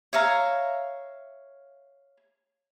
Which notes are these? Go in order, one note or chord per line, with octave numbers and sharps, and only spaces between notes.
C#5 E5 F5 A#5